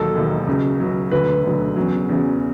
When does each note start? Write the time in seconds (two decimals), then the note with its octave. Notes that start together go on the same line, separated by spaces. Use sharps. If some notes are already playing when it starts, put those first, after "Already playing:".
Already playing: E1 D#2 D#3 F#3 A4
0.15 E1 D#2 D#3 F#3
0.47 C#2 C#3 F#3
0.80 C#2 C#3 F#3
1.11 E1 D2 D3 F#3 B4
1.44 E1 D2 D3 F#3
1.76 E2 C#3 F#3
2.09 E2 C#3 F#3